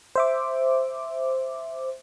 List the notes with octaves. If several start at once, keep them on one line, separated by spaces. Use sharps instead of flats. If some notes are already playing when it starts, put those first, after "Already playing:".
C5 E5 D6